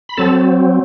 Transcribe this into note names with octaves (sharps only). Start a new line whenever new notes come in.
B5
F#3 C4 A4 A5